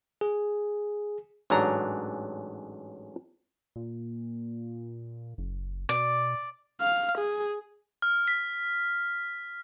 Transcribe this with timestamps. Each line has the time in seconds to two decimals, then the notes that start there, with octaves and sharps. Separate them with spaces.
0.21 G#4
1.50 A1 G#2 F#3 D4 A#5
3.76 A#2
5.38 F#1
5.89 B2 D5
6.81 F5
7.18 G#4
8.02 F6
8.28 B6